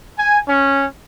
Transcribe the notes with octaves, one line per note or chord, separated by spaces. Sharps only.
G#5
C#4